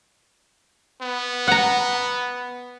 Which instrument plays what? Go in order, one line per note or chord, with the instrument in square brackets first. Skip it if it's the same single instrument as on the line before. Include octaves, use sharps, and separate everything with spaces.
[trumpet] B3
[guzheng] F#5 A#5